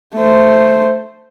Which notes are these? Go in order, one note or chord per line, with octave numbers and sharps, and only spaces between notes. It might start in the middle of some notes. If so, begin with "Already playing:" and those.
A3 C5